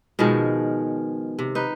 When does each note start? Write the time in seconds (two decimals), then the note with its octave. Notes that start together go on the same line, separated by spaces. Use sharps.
0.19 B2 D#3 F3 G#3
1.39 C3
1.55 D#4 B4